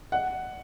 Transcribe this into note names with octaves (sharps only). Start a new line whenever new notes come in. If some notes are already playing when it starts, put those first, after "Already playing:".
F#5